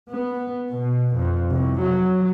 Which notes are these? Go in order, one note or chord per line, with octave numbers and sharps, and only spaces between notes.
B3
B2
F2
C2
F#3